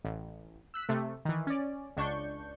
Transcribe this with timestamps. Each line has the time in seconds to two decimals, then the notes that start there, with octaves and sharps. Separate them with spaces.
0.05 A1
0.74 E6 F#6 B6
0.89 C3 A3
1.25 D#3 E3
1.47 C#4 D5
1.97 C#2 D4 C#6 G6